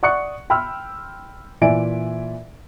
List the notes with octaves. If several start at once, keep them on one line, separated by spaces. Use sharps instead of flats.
D5 F#5 C#6 D#6 F#6 C#7
G5 B5 C6 E6 F6
A#2 E3 D5 E5 G#5 D7